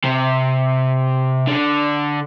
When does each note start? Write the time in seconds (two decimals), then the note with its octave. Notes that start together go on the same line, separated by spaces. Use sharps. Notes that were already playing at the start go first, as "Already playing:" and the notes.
0.04 C3
1.47 D3